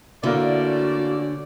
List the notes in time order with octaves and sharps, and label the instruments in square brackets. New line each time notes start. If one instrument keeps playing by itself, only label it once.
[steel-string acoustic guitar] D3 [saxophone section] A3 C#4 D5 [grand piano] A#3 E4 [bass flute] F#4